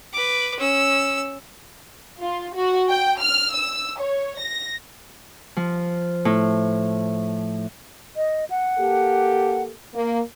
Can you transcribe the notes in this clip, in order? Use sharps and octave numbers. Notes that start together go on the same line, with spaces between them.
B4 D6
C#4 E6
F4
F#4
G5
F6
E6
C#5
A#6
F3
A2
D#5
F#5
A#3 G4 A4
A#3